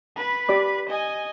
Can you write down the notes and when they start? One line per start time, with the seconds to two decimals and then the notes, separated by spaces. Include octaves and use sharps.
0.16 B4 B5
0.49 G4 D5 D6
0.89 D#5 G#5